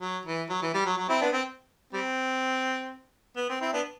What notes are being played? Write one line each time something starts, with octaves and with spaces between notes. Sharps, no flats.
F#3
E3
F#3
E3
G3
F#3
F#3
C4 E4
B3 D4
C4
G3 C4
B3
C4
C4 E4
B3 D4